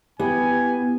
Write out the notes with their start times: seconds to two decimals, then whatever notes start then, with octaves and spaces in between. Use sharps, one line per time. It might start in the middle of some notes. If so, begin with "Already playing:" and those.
0.20 B3 E4 G4 B4 G#5